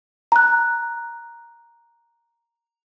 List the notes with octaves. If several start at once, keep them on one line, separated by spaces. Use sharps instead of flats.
A#5 F#6